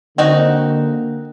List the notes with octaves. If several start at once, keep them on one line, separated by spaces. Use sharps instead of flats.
D3 A#3 C4 D#4 F#4